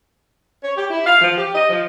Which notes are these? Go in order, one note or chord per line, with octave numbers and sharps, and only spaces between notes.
C#5
G4
E4
F5
F3
G4
D#5
F3